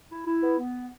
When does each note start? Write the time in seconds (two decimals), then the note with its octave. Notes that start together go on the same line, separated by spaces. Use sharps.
0.10 E4
0.27 E4
0.42 B3
0.59 B3